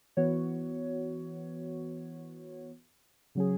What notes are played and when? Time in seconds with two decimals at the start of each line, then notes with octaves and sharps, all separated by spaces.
0.17 E3 B3 F#4 C#5
3.35 C#3 F#3 C#4 G#4